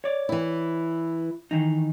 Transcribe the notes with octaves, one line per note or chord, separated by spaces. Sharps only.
C#5 D5
E3 E4
D#3 E3 D#4